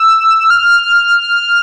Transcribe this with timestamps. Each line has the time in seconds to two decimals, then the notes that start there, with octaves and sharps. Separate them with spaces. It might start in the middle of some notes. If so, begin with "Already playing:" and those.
Already playing: E6
0.50 F6